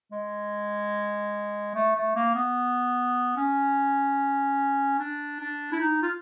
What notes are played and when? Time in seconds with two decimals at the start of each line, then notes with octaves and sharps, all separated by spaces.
0.12 G#3
1.75 A3
1.95 A3
2.15 A#3
2.35 B3
3.36 C#4
4.99 D4
5.40 D4
5.72 E4
5.81 D#4
6.02 F4